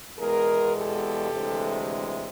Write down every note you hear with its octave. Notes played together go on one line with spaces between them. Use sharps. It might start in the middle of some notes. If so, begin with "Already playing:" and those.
E2 B2 G#3 G#4 A#4
G4 A4
D2 C3 E3 G#3